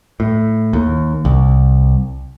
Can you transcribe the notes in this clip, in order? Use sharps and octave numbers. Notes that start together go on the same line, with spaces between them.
A2
D#2
C2